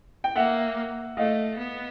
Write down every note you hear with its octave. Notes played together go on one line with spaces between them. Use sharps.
G5
A#3 E5 F#5
A3 D#5 F5
B3